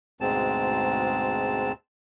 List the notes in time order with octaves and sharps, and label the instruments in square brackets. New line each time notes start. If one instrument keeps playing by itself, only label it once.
[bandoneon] D2 G#2 B2 G#3 C4 A5